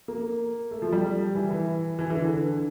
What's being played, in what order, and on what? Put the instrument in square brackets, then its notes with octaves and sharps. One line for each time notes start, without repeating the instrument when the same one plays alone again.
[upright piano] A#3
A3
F3
G3
E3
E3
E3
E3
D3